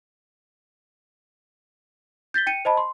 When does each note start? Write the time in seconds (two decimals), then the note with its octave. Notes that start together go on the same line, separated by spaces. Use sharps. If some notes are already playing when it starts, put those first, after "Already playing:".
2.34 G6 A6 B6 G7
2.47 G5 C#7 D#7
2.65 C5 D#5 A5 B5
2.77 C6